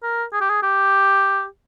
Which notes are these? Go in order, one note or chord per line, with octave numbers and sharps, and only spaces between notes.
A#4
G#4
G4
G#4
G4